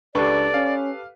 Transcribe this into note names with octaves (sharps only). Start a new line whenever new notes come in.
C#2 D4 G4 A4 B4 D5 C#6
C#4 F5